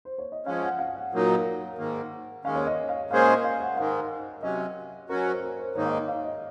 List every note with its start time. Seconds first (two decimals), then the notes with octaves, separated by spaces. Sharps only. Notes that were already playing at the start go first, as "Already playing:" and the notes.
0.05 C5
0.18 C#5
0.32 D#5
0.46 F3 G#3 C#4 F5
0.62 F#5
0.79 F5
0.96 F#5
1.12 A#2 F#3 A#3 D#4
1.78 G#2 D#3 A#3
2.44 D#2 D#3 G#3 C#4 F5
2.55 C#5
2.67 D#5
2.89 F5
3.11 A#2 G#3 C#4 G#4 C5 F5
3.27 D#5
3.44 F5
3.60 F#5
3.77 G#2 D#3 G#3 F5
4.43 C3 F#3 C#4 D#5
5.09 F#3 C#4 F#4 A#4
5.25 C5
5.42 A#4
5.59 C5
5.75 G#2 D#3 A#3 D#4 C#5
5.85 F5
5.91 D#5
6.08 F5
6.24 D#5